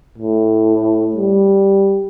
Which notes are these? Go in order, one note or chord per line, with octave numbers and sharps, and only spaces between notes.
A2
G3